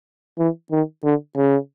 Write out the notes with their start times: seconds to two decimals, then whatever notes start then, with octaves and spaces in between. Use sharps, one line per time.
0.39 E3
0.72 D#3
1.04 D3
1.37 C#3